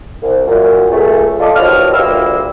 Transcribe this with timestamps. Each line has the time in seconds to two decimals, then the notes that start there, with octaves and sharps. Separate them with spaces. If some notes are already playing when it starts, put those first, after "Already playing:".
0.22 C2
0.47 F#2 A#2
0.92 C#2 A3
1.39 F4 A4 D5 D#5
1.56 D#2 F3 F#3 B3 D#5 F6
1.93 D2 G3 A#3 F4 E5 E6